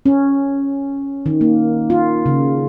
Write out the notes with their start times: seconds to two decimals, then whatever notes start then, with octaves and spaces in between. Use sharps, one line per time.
0.06 C#4
1.26 D#3
1.41 A#3
1.90 F4
2.26 C#3